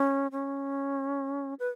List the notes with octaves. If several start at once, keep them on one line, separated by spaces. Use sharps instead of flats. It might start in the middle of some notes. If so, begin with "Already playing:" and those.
Already playing: C#4
C#4
B4